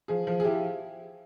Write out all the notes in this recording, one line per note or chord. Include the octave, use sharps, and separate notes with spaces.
F3 G#4
F3
G#4
E4 G4